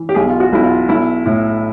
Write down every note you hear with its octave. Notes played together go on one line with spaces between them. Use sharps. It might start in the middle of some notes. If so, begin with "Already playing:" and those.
Already playing: E3
G4
B1 G#4
F4
F#4
B1 E4
F4
B1 E4
A2